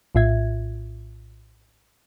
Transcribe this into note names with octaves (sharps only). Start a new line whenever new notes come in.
A#1 A2 F4 E5 G#6